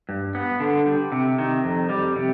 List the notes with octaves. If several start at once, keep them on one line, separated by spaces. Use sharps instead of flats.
G2
B3
D3
G3
C3
D#3
F2
G3
C3